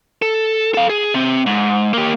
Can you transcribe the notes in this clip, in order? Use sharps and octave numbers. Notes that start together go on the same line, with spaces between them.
A4
A4 F5
G#4
C3 C4
G#2
A#3 G4